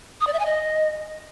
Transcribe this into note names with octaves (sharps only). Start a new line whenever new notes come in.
D#6
D5
E5
G#5
D#5